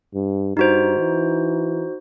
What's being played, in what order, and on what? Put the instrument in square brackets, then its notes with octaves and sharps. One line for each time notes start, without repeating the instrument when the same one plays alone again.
[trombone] G2
[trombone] G2 [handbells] D#4 F#4 C5
[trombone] E3